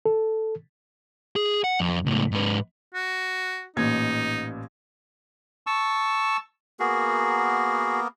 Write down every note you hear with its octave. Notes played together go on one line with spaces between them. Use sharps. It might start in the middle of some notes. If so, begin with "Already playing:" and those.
A4
G#4
F#5
F2
C#2 A2
G#2 B4
F#4
A1 A#2 D#4 G#6
A5 C#6 E6
A#3 B3 F#4 G#4 A#4